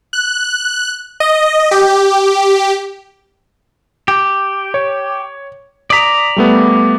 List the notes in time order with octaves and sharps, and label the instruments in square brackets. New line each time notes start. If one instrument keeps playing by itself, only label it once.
[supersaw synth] F#6
D#5
G4
[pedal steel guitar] G4
[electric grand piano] C#5
[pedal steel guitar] D5 A#5 [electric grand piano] D#6 B6
[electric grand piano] G3 A3 B3